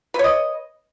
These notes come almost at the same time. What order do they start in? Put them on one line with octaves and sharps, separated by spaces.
B4 C#5 D#5